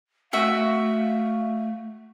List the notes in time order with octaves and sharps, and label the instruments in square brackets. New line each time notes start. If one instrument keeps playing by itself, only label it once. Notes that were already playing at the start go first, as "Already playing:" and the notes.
[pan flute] A3 [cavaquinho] F#4 E5 [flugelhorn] F5